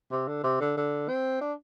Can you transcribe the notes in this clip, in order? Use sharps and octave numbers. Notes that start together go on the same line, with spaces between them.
C3
D3
C3
D3
D3
C4
D4